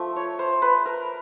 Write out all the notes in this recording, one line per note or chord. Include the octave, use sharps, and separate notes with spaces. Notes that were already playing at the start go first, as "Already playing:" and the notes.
Already playing: F3 A3 E5
C#5
C5
B4
A#4